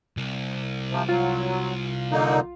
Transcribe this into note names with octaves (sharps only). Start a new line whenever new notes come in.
C2
C3 F3
F#3 F4
D3 A#3 D#4